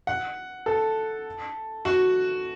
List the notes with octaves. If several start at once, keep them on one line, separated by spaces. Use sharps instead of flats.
F#5
A4
F#4